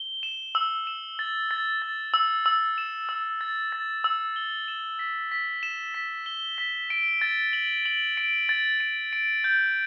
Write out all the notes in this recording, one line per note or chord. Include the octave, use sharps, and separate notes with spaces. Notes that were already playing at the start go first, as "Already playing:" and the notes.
Already playing: G7
E7
E6
E7
A6
A6
A6
E6
E6
E7
E6
A6
A6
E6
G7
E7
B6
B6
E7
B6
G7
B6
D7
A6
F#7
F#7
D7
A6
D7
D7
G6